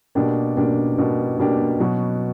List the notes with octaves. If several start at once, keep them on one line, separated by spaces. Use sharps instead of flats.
B2 A#3 D4 G4
B2 A#3 D4 G4
B2 A#3 D4 G4
B2 A#3 D4 G4
B2 F#3 B3 F#4